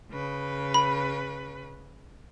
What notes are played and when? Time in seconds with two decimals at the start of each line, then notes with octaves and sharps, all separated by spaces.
0.12 C#3 B4
0.74 B5